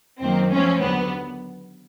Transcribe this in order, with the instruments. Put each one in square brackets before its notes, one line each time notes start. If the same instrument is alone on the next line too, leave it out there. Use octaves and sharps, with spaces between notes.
[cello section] F#2 D#3 F#3 A#3 [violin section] C4
[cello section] F3 A3 C4 [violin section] C#4
[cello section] D#2 D3 F#3 [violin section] B3